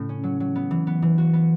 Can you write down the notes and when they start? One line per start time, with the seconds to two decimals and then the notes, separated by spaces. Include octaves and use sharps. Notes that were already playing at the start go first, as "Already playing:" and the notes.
Already playing: A2 C#3 A3
0.09 C#4
0.24 F#3
0.40 F#3
0.56 B3
0.71 E3
0.87 B3
1.02 E3
1.18 F#4
1.33 B3